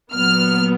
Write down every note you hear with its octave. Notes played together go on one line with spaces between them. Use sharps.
A#2 F#3 B3 F6